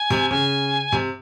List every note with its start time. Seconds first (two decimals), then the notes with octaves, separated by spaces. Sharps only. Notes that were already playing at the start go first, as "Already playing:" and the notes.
Already playing: G#5
0.10 C3
0.30 C#3 G#5
0.92 C3